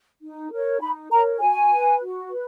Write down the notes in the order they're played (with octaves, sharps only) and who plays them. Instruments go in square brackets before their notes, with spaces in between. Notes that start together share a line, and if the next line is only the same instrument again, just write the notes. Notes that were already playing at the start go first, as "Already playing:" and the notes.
[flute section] D#4
A#4 C#5
D#4 B5
A#4 C#5 A#5
F#4 G#5
B4
F#4
B4